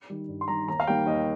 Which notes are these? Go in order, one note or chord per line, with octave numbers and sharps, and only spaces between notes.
D#3 G3
G2
C6
D#3 G3 A#5
D#2 A#5
F5
D#3 G3 A#3 G5
D#2 D#5